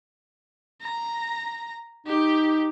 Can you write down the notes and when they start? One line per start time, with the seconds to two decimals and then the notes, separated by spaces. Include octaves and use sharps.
0.82 A#5
2.07 D#4 G4